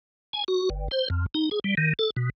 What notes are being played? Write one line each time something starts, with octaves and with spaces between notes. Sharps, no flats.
G#5
F#4
G1
C5
F2
D#4
G#4
G3
D#3
A4
B2